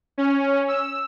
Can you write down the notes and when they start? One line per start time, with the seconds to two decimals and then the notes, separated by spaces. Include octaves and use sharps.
0.18 C#4
0.68 E6